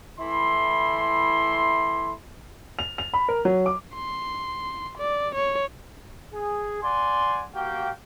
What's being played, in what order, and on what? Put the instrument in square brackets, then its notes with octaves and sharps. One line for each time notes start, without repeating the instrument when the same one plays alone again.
[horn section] E3 A3 E4 C6
[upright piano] F7
F7
B5
A#4
F#3
D6
[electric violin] C6
D5
C#5
[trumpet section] G#4
D5 F#5 G#5 C6
A#3 F#4 G4 F5 G5